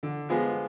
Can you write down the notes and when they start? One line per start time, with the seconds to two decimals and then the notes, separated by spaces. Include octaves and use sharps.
0.03 D3
0.29 F3 G#3 B3